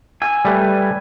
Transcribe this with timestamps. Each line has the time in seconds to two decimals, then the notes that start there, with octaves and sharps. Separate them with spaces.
0.22 G#5 E6
0.45 G3 A3 B4